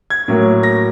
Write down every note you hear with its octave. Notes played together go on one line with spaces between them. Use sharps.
G#6
A2 F#3 A#3
A#6